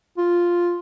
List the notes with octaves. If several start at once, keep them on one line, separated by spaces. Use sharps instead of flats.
F4